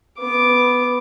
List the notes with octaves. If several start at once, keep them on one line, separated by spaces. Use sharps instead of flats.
B3 D6